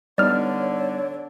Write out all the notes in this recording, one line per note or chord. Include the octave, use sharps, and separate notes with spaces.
D3 G3 B3 D#4 C#5 D5 F6